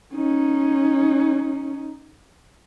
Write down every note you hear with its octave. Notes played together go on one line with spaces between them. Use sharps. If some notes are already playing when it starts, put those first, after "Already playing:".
C#4 D#4